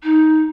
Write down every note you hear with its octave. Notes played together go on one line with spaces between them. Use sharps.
D#4